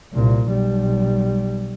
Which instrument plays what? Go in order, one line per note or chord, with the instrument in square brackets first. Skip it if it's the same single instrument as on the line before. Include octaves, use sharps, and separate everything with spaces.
[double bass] C2 A#2
B1 G3